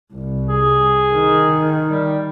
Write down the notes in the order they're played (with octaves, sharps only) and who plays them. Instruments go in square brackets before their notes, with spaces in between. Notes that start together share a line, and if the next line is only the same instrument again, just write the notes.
[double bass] C2
[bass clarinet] G#4
[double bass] D#3
[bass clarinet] G3